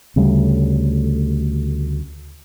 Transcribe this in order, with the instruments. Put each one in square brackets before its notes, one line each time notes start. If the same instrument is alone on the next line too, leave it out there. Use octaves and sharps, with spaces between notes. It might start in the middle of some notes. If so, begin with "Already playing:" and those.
[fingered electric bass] D2 C#3 G3 A3